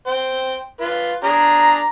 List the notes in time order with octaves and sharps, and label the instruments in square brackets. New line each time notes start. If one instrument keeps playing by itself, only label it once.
[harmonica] C5 G5
F4 B4
[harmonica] D4 G#4 [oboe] A#5